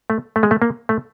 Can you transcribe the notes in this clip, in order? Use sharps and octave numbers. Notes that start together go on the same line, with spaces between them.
A3
A3
G#3
A3
A#3
A3